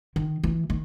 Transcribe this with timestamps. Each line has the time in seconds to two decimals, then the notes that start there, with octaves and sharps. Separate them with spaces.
0.16 D#3
0.43 E3
0.70 D#3